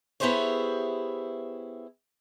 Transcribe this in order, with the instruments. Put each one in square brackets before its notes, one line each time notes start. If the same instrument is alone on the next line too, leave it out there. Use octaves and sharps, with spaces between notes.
[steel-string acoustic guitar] B3 E4 G4 G#4 C5 C#5